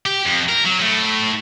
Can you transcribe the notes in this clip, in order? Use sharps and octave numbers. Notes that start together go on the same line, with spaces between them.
G4
F2
A#4
F#3
A2